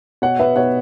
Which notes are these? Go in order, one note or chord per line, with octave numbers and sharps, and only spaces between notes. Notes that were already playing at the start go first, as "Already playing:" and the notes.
B2 C#5 F#5
B3 B4 E5
B2 C#5 F#5